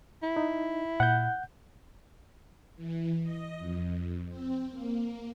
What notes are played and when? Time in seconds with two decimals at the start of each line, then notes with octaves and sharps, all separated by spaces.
0.23 E4
0.37 D#4
1.00 A#2 F#5 G6
2.76 E3
3.22 D#5
3.59 F2
4.29 C4
4.71 A#3